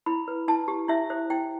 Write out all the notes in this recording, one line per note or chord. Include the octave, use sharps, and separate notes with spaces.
E4 B5
B4
E4 A5
G4
E4 E5
C5
E4 G5